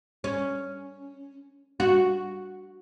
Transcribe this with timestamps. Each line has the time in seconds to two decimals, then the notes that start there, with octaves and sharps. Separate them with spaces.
0.24 C#4
1.80 F#4